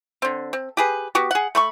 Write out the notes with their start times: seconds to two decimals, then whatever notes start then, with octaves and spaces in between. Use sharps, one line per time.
0.22 D3 C4
0.53 C4
0.77 G4 G#4 B4
1.15 B3 F#4 G4
1.31 G#4 F#5
1.55 A3 B5 C#6